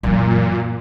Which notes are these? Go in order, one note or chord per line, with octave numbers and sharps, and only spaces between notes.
F#2 A#2 E3